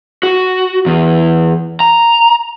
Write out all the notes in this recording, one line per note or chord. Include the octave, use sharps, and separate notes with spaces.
F#4
E2
A#5